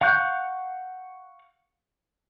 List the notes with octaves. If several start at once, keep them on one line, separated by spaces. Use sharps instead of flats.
F5 F#5 C#6 F#6 G6